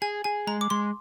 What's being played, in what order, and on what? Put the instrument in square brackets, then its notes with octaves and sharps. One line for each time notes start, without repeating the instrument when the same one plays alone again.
[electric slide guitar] G#4 [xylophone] G#5
[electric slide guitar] G#4 [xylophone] G#5
[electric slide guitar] G#3 [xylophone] A#5
[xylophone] D6
[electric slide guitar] G#3 [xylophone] C6